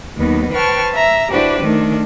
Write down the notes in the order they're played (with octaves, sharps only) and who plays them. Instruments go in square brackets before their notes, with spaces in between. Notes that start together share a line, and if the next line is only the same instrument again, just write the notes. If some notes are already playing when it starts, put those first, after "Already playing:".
[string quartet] D#2 F#3 B3 D#4
B4 C5 G5 A5 C#6 F6
E5 A#5
D4 E4 F#4 G4 B4 C5
D#3 A3 D4